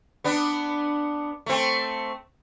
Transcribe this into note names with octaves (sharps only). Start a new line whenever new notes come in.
B3 D4
A3 C4